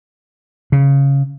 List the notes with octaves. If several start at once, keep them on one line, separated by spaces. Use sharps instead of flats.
C#3